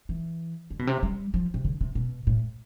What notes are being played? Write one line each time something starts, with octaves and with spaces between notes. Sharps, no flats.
E3
D3
B2
C3
G3
F3
C3
D3
C3
B2
A2